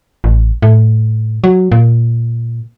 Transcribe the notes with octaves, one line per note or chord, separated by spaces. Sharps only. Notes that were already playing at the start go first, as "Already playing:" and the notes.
A1
A2
F#3
A#2